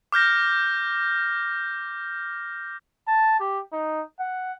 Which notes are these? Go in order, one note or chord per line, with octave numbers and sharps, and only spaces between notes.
D6 F6 G6 A#6
A5
G4
D#4
F#5